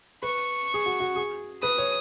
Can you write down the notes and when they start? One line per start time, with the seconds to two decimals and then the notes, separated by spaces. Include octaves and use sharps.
0.23 B4 C#6
0.74 G#4
0.86 F#4
1.00 F#4
1.16 G#4
1.63 B4 D#6
1.78 C#5